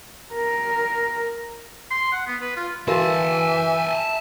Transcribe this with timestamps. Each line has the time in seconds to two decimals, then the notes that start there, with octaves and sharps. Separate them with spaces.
0.34 A#4
1.91 C6
2.12 F#5
2.27 B3
2.41 B4
2.57 F4
2.88 E3 F#4 A#4 E5 F5 G#5 A5